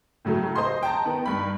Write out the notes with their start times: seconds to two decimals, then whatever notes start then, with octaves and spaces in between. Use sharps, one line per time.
0.25 A2 C#3 F#3 A3
0.56 C5 D#5 C6
0.83 G5 A5 A#5
1.05 D#3 B3
1.26 G2 B5